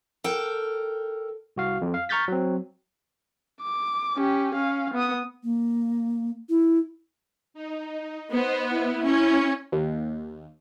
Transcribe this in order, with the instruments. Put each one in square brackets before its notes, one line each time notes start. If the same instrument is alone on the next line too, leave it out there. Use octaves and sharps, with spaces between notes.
[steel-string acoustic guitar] A4 A#4 G5
[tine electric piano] C2 F#4 F5
F2
F5
A#5 C#6 F6 G6 A6 B6
F#3 C4
[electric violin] D6
C#4 G4
C#4 F5
B3 D#6
[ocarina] A#3
E4
[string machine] D#4
[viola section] B3 [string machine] C5 D#5
[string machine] E4
[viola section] C#4
[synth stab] D#2